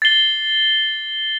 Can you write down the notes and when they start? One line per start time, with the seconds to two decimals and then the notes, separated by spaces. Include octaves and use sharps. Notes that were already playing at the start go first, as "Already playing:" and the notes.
0.02 A6 C7 G7